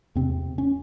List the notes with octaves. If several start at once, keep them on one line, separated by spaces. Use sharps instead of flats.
E2 C3 C4
C#4